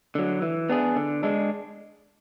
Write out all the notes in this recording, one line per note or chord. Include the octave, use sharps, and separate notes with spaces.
D3 F#3
E3
B3 D4 G#4
D3
G#3 D4